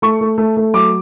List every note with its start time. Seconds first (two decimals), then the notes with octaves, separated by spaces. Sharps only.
0.02 A3 C#6
0.21 A3
0.38 A3
0.57 A3
0.74 F#3 D6